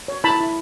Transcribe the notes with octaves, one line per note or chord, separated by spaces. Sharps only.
C#5
E4 A5 B5
E4